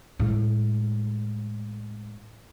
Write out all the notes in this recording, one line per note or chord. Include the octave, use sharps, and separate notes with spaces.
A2 G#3